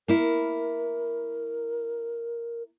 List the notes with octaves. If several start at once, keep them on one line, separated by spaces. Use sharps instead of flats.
A#3 E4 A#4